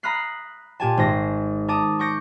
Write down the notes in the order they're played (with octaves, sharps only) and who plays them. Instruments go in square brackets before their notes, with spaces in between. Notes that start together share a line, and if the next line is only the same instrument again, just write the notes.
[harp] A#5 B5 D#6 F6 F#6 C7
A#2 G4 G#5 A5
G#1 C5 A#6
A#4 A5 D6 D#6
C#6 D6 G6 A#6 C#7 D7